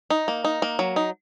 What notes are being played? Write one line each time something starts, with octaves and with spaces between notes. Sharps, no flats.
D#4
A#3
D#4
A#3
F#3
D#4